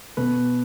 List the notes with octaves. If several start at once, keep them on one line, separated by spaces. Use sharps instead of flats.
B2 B4